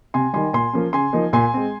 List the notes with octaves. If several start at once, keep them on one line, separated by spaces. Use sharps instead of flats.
C3 G#5 C6
D#3 G3 G#5 C6
A#2 G#5 C6
F3 A#3 C#4
C#3 G#5 C6
F3 A#3 D#4
A#2 G#5 C6
G#3 C4